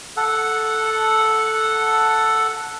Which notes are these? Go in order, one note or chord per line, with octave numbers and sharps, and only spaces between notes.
A4 F#5